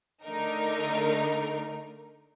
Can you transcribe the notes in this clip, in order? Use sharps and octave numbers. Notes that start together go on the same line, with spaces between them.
D3 A3 D#4 A#4